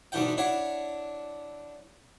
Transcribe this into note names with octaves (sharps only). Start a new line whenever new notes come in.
G#2 B2 D3 E3 F#5 G5
D4 E4 C#5 F#5